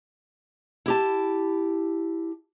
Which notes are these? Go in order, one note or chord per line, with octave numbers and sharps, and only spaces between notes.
E4 G4 A5